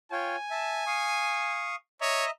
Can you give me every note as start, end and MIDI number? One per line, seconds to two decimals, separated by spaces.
0.12 0.36 65
0.12 0.36 73
0.12 0.36 79
0.12 1.77 80
0.51 0.84 76
0.51 0.84 81
0.87 1.76 77
0.87 1.76 85
0.87 1.76 87
2.01 2.25 73
2.01 2.31 75
2.01 2.31 76
2.01 2.31 82